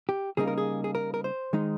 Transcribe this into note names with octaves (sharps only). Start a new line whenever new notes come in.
G4
C#3 G3 A#3 D#4 G#4
A#4
G#4
G#4
A#4
A#4
C5
D#3 G#3 D#4